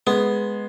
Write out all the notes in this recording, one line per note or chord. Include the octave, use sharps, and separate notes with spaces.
G#3 B3